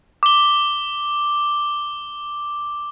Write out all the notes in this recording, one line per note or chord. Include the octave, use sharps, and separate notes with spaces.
D6 G7